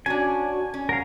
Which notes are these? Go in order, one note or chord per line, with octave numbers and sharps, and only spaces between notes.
C#4 D4 F#4 G#5
C#4
A#4 F5 F#5